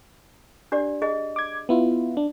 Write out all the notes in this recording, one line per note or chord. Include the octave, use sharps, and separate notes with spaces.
D4 G4 D5
G#4 D#5
D6 G#6
B3 E4 F4
D4